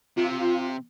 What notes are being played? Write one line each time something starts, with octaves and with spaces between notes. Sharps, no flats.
C3 F4